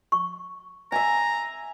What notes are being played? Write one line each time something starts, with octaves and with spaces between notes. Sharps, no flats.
C#6
E5 G#5 A#5